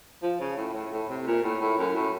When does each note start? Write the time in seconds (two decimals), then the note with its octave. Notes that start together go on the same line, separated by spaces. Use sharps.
0.23 F3
0.40 C#3
0.57 A2
0.74 A2
0.92 A2
1.09 C3
1.27 A#2
1.43 A2
1.61 A2
1.78 F#2
1.95 A2